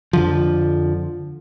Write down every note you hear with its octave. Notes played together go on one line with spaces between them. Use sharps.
F2 D3 F3